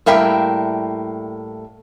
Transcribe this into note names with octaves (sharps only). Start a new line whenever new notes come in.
A2 G3 A#3 E5 G5